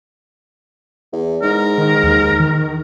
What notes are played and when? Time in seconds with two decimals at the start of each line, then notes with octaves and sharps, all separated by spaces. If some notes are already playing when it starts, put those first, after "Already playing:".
1.13 E2
1.42 G#2 A#4
1.78 D#3
2.03 D#2
2.40 D#3